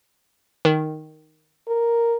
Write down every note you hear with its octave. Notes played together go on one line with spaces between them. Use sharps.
D#3
A#4